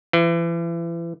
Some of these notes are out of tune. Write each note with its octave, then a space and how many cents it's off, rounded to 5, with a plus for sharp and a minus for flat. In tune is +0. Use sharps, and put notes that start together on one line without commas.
E3 +35